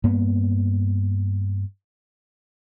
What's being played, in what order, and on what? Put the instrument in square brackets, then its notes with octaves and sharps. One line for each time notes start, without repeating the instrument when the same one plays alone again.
[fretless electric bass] G2 A#3 B3